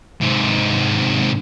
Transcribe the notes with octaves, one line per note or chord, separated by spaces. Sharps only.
G#2 C3